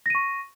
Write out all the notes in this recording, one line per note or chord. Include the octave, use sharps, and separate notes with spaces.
C#6 A#6 D#7